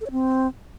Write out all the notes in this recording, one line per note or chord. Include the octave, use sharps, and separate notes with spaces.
A4
C#5
C4